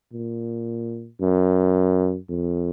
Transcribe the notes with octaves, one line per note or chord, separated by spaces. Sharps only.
A#2
F#2
F2